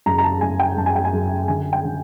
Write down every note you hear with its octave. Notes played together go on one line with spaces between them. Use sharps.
F#1 A#5
A#5
A5
F#1 G#5
G5
F#1 A5
G#5
G5
G#5
F#2
D3 G#5
G5
D3